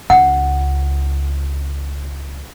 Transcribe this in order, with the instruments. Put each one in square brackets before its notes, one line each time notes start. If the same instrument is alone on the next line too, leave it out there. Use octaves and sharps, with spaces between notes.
[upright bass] C#2 [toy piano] F#5